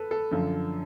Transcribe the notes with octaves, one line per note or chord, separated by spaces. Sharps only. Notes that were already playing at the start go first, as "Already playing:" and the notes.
Already playing: A4 B4
A4
F#2 D3 F3